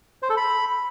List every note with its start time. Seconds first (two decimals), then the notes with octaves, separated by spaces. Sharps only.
0.23 C5
0.30 A4
0.37 B5